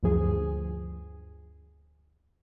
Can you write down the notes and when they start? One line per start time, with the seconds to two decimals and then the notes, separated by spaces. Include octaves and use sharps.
0.03 D2 G2 F3 G#4